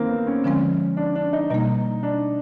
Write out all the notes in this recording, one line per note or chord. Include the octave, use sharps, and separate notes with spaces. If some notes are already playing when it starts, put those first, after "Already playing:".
Already playing: D#3 A#3 C4
B3
C#4
D3 F3 G#3 C4 C#4
D4
D4
D#4
B2 G3 A#3 D#4
D4